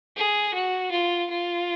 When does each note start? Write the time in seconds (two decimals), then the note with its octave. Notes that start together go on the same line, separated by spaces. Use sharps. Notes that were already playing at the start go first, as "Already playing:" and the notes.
0.17 G#4
0.54 F#4
0.91 F4
1.30 F4